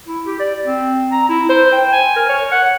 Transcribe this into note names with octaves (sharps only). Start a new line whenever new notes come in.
E4
G4
D5
C4
A#5
E4
C5
G5
G#5
A#4
C#5
F#5